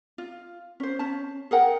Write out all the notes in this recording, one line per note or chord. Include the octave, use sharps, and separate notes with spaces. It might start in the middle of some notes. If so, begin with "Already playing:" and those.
F4
C#4 C5
C#4 A5
G#4 A#4 F#5 G5